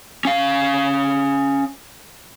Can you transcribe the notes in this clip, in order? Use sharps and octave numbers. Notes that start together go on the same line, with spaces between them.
C#4 F5